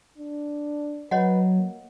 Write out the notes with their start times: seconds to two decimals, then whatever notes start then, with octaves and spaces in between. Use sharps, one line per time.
0.18 D4
1.11 F#3 B4 C#5 D#5 F#5
1.56 A#3